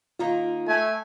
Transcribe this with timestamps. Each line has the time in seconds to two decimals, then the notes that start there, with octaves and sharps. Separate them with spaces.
0.19 D#3 A#3 D#4 F4
0.68 A3 G#5